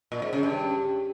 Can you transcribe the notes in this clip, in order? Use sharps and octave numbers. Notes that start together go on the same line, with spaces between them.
A#2
G#2
C#3
G2